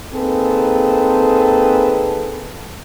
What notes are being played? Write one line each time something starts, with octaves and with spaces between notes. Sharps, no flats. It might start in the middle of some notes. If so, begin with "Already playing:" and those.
A#3 C4 D#4 G#4 A4 B4